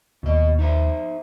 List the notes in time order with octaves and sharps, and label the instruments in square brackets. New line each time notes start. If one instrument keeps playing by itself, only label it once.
[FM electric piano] D#2 [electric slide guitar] B2 D#5
[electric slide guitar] D#4 C5 E5